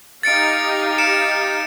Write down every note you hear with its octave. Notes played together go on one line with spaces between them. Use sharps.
D#4 G4 F5 A6 C#7 D7
C#7 D7 E7